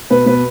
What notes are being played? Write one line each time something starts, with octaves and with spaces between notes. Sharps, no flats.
B2 B4
B2 B4